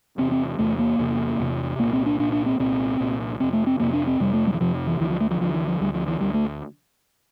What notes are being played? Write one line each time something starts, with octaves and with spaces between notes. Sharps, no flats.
E2 C3 C4
C4
E2 C3 A3
A#3
E2 C3
E2 C3
C2 A#2 A#3
C4
D4
C2 A#2 D4
D4
C4
C2 A#2 C4
C2 A#2
F2 C3 C4
A3
C4
F2 C3 A#3
D4
C4
F2 C3 G3
A3
G3
E3
F2 C3 F3
E3
D2 D3 E3
F3
A3
F3
D2 D3 F3
E3
F3
D2 D3 G3
F3
E3
D2 D3 G3
A3